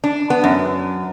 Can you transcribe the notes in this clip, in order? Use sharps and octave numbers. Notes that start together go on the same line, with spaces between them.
D4
B3
F#2